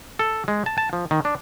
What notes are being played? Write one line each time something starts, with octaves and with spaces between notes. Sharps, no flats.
A4
G#3
A5
A5
F3
D#3
D4